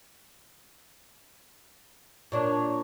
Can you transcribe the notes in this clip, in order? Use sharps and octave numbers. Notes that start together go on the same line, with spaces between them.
A#2 D4 C#5